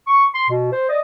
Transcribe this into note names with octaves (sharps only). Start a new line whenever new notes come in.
C#6
C6
B2
C5
D5 D#5